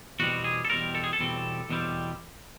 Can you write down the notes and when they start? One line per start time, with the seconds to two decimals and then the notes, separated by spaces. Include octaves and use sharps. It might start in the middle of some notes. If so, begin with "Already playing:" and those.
0.20 E2 B2 G3 C4 F#4
0.44 G#4
0.65 A4
0.70 E2 B2 G3 C4 A#4
0.95 A4
1.04 G#4
1.13 A4
1.19 E2 B2 G3 C4
1.70 E2 B2 G3 C4